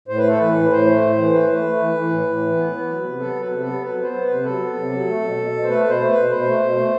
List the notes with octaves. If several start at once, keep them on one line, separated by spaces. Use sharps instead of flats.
A2 C5
B4
A3 A4
E3 B4
A2
A2 C5
A3
A2
E3
A3 B4
A3
A3
E3
E3
A2
A2
E3
B3
B3
F#3
C3
B3 A4
F#3 B4
C3
A4
B3
F#3 B4
B3 C5
B3
B4
C3
F#3 A4
B3
C3
F#3
A3
B2
B2
B2
C5
A3 B4
B2
C5
A3
B4
B2
B2 C5
A3
B2
A3